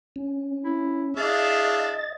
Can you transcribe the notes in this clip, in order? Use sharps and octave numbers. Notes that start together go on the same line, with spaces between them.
C#4
E4
D4 E4 G#4 D#5 F5 A6